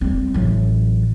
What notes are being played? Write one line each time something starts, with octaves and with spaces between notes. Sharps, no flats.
G3 C4
A1 F#3